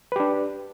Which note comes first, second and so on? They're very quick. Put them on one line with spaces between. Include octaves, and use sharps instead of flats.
B4 G4 D4